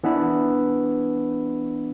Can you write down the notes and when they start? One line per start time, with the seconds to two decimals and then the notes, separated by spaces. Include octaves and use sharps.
0.04 E3 B3 D4 E4